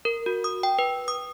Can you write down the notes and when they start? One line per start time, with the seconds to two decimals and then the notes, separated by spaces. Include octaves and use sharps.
0.05 A#4
0.26 F#4
0.44 D#6
0.63 G5
0.79 B4
1.08 D#6